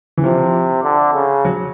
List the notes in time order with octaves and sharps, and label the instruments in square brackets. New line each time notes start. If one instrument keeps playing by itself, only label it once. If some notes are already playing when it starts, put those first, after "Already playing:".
[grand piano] E3
[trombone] C3 [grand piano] F3
[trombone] D3
C#3
[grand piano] F#3